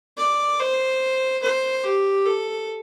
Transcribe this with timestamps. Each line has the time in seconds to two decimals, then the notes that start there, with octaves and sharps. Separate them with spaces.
0.18 D5
0.60 C5
1.42 C5
1.84 G4
2.26 A4